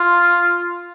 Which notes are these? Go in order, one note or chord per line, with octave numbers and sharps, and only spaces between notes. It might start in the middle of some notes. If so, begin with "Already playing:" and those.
Already playing: F4